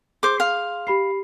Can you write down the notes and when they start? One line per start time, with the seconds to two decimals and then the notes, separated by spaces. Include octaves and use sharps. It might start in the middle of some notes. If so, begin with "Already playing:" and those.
0.23 G#4 C5 C6 D6
0.40 F5
0.87 G4 B5 C7